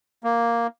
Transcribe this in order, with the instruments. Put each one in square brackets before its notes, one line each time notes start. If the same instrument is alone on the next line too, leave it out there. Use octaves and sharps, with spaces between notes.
[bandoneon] A#3